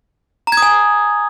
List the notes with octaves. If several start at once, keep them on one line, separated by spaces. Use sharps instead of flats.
A#5
G#6
D#6
G#5